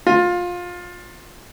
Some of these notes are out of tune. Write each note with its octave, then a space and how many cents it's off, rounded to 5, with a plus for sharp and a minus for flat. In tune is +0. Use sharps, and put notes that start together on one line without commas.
F4 +20